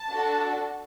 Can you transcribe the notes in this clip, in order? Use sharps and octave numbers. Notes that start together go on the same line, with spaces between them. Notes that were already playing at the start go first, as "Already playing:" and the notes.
Already playing: A5
D4 F#4 A4